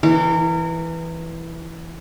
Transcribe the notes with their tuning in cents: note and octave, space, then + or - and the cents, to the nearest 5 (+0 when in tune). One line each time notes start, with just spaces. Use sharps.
E3 +0 A#4 -30